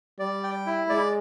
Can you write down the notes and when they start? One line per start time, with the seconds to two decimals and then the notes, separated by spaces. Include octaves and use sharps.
0.19 G3 D5
0.43 G5
0.66 E4
0.89 G#3 D5